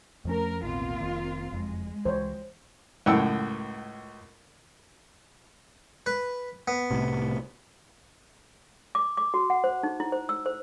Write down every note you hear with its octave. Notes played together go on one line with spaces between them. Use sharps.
F2 F3 A3 C#4 A#4
A1 D#2 B2 A#3 C4 F4
F1 D#3
F#1 F2 G#3
C#2 E3 C5 C#5
C#2 F#2 A2 F#5 G5 E6
B4
B3
C2 A2 C3
D6
D6
F#4
F#5
C5
D#4
E4
C5
E6
C5